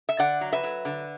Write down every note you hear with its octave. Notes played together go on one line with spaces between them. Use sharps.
E5
D3 D5 F#5
F#3
B4 E5
F#3
D3